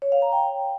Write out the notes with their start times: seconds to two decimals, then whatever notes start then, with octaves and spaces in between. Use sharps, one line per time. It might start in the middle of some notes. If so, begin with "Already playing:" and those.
0.02 C#5
0.12 F5
0.22 A#5
0.32 G5